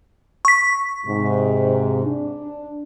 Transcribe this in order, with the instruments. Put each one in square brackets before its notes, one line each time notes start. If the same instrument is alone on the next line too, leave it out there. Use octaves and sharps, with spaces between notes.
[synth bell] C#6 B6
[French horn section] G#2 C3
D4